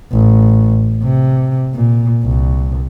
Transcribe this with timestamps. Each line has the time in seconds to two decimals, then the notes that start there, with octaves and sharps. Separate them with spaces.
0.12 A1
1.03 C3
1.75 A#2
2.24 C2